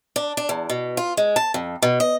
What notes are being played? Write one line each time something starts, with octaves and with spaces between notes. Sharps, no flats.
D4
D4
E2
B2
F4
G#3
A5
F2
B2
D#5